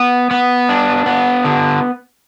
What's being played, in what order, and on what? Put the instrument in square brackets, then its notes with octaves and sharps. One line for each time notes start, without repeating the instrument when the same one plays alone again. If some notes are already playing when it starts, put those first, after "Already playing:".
Already playing: [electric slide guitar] B3
B3
D4
B3
D3